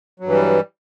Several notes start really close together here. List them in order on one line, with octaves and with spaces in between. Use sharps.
F#3 G2 E3 G3